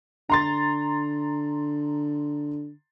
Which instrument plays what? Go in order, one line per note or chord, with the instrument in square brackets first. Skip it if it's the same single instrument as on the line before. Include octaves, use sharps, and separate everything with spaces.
[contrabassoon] D3 [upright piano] A#5 C6 A6